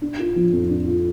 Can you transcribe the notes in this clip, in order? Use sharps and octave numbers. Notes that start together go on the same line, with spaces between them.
D4
F4
F3
F2
D4
F4